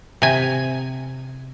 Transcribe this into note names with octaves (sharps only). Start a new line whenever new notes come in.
C3 G#5